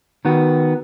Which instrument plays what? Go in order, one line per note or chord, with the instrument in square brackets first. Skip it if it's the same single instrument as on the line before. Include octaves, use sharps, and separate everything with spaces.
[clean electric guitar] D#3 B3 F#4